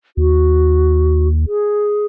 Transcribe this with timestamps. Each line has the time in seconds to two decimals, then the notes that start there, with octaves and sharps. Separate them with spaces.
0.17 D#2 F#4
1.47 G#4